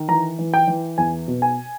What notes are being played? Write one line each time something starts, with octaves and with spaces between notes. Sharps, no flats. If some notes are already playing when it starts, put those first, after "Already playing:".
Already playing: D#3
E3 A#5
E3
G5
E3
E2 G#5
B2
G#5